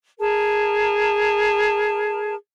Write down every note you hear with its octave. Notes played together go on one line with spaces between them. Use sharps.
G#4 A#4 A5